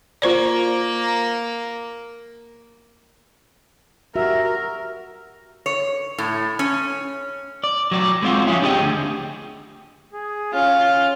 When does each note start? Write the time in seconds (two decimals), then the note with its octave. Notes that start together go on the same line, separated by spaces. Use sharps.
0.22 A#3 F4 C5 D5
4.16 F#4 G4 A#4 E5
5.66 C#5
6.18 A2
6.59 C#4
7.64 D5
7.91 F#3 D5
8.23 G#3 C4 D#4 F4 F#4
8.47 F3 F#3 C#4 F4 G#4 E5
8.62 D4 G4 G#4 D#5 G5
8.80 D2
10.14 G#4
10.54 C#4 F4 F6